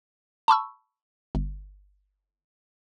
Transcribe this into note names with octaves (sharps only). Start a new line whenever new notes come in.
A5 B5 C#6 E6
G1